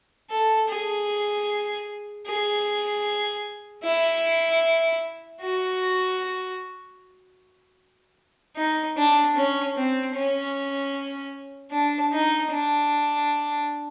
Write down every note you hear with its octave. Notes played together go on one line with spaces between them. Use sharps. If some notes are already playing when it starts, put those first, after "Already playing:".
A4
G#4
G#4
E4
F#4
D#4
D4
C#4
C4
C#4
D4
D#4
D4